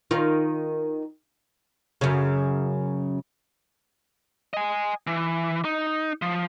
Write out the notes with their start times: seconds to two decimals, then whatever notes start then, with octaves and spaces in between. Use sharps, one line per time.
0.11 D#3 F4
2.01 F#2 C#3
4.54 D#5 G#5
5.07 E3
5.65 D#4
6.22 F3